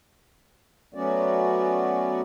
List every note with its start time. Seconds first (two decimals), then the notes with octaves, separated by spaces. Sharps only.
0.94 F#3 A3 B3 C#4 F#4 D5